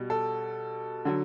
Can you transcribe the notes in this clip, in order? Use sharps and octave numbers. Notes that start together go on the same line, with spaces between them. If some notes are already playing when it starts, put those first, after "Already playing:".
Already playing: B2 G3
A4
D3 F#3